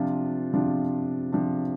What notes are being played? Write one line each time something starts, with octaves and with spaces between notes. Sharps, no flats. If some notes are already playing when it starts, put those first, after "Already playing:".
Already playing: C3 F3 D4 F4
C3 F3 D4 F4
C3 F3 D4 F4